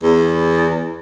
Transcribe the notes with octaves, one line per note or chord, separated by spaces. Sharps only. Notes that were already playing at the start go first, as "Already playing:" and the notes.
E2